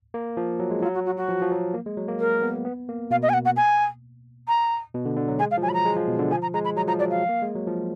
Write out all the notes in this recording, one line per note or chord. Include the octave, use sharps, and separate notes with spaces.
A#3
F3
F#3
G#3
D#4
F#3 F4
F#4
F#4
F#4
F3
F3
F#3
A#3
G#3
F#3
A#3
A#4
B3
B3
A#3
B2 F5
D#5
G#5
F#5
F#5
G#5
A#5
B2
D3
D3
F#3
G#3 G#5
F5
F3
F#3 G#5
B5
A#5
G#3
F3
B2
D3
F3 G#5
A#5
G#3 A#5
B5
F#3 A#5
F3 A#5
F#3 D5
F5
A#3
G#3
F#3
F3